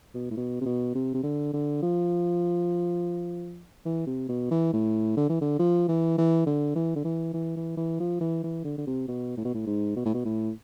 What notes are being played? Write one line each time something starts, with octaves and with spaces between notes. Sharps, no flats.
B2
A2
B2
C3
B2
C3
C3
D3
D3
F3
E3
C3
B2
E3
A2
D3
E3
D3
F3
E3
E3
D3
E3
D3
E3
E3
E3
E3
F3
E3
E3
D3
D3
C3
B2
A2
B2
A2
G#2
B2
A2
B2
A2